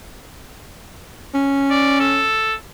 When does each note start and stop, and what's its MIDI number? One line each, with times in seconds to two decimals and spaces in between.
1.34 2.25 61
1.71 1.97 74
2.00 2.55 69